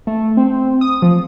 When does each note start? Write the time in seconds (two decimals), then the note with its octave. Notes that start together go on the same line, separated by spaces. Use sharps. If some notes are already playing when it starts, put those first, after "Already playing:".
0.07 A3
0.37 C4
0.81 D#6
1.02 F3